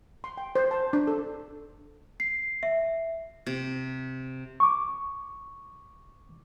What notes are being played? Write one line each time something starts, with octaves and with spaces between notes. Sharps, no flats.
C6
G5
C5
A5
D4
A4
C7
E5
C3
C#6 D6